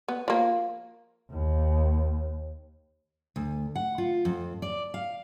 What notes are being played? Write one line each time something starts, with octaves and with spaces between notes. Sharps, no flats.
B3
F3 A#3
D#2
D2
F#5
F4
F2
D5
F5